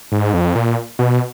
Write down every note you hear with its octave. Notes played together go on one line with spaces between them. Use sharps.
G#2
F2
A#2
B2